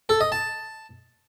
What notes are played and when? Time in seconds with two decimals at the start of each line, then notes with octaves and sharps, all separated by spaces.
0.09 A4
0.21 D#5
0.32 A5